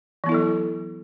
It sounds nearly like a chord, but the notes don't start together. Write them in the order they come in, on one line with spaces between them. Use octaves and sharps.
E3 B3 E4 A4 F#3